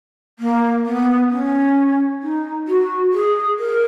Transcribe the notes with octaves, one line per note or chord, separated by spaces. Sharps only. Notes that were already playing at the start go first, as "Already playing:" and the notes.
A#3
B3
C#4
D#4
F#4
G#4
A#4